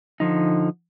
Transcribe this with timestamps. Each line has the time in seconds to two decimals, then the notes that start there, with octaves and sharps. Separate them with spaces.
0.20 D3 F3 D#4